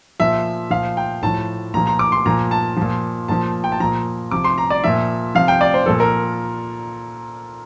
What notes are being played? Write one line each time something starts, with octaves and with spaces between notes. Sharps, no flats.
A#2 F3 E5
A#2 F3 F5
G5
A2 F3 A5
A#2 F3 A#5
A#5
D6
C6
A#2 F3 A#5
A5
F3
A#2
A#2 F3 A5
G5
A5
A#2 F3 A#5
C3 F3 D6
C6
A#5
D5
A#2 F3 E5
C3 F3 F5
G5
D5
C5
A#2 F3 A4
A#4